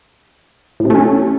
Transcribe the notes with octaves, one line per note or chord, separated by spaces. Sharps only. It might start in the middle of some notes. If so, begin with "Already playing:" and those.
A2
C3
A3
C#4